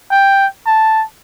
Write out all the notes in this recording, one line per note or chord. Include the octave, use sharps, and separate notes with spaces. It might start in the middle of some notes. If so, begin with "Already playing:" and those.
G5
A5